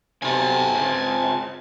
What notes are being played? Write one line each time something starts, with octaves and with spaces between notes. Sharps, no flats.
B1 C3 G#5 A5
C#2 C4